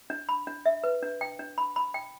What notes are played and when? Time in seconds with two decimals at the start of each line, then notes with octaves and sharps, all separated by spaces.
0.10 D4
0.29 B5
0.47 D4
0.66 E5
0.84 B4
1.03 D4
1.21 G5
1.39 D4
1.58 B5
1.76 B5
1.94 G5